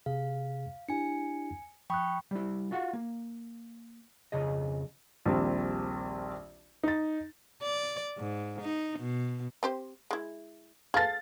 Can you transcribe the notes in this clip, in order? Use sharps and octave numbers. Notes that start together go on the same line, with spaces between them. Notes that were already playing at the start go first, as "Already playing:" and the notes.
C3 G#4 F5
D4 E4 G4 G#5 C#7
F3 G5 B5 C#6 D#6 F#6
G3 E4
F4 F#4 F5 F#5
A#3
F2 C#3 G#4 D#5
A#1 D#2 G3 C4
D#4 A6
D5
G#2
D#4
B2
C4 G4 C5
G#3 E4
G#4 A4 F5 A6